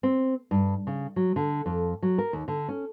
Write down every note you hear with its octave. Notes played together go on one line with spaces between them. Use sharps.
C4
G2
C#3
F#3
D3
F2
F#3
A#4
D#2
D3
C#4